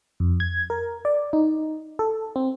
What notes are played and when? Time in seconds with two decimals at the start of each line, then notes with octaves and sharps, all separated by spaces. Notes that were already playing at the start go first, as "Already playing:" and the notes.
0.20 F2
0.40 G#6
0.70 A#4
1.05 D5
1.33 D#4
1.99 A4
2.36 C4